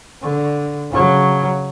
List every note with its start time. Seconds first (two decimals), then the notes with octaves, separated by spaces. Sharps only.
0.22 D3
0.90 C#3 F#3